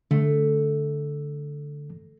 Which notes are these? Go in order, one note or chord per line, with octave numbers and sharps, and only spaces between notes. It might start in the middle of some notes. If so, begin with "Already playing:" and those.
D3 A3